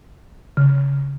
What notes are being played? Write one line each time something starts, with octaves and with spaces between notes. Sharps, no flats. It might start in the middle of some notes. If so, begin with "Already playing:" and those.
C#3